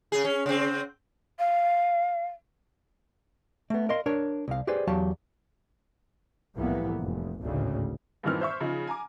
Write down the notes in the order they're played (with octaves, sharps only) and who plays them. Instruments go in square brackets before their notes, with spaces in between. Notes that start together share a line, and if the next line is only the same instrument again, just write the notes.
[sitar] C#3 G#4
C#4
C#3 C4
[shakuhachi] F5
[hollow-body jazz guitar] A3 B3
A#4 D#5 F5 C6
D4 A#4 C#5
C2 F5
G4 G#4 B4 C5 D5
E2 F#3 F#4 G4 F5 A5
[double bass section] C2 F2 A2 E3 A#3 B3
F1
G#1 D2 A2 C#3
[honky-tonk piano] G2 A#2 D#3 E3 C4 F6
C5 E5 C#6
C#3 F3 D#4
G#5 A#5 D6